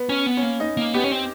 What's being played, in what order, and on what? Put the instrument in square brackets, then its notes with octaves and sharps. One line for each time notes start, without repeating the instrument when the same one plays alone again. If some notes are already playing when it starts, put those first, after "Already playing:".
Already playing: [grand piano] B3
[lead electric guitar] C#4
B3
[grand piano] C#4
[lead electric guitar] A#3
[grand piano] D#4
[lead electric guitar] A#3
[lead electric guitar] B3 [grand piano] G4
[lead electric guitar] C#4
C4